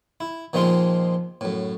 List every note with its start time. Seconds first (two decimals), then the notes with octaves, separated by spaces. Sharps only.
0.21 E4
0.53 A#2 D#3 F3 G#3 C4 F4
1.41 F#2 A2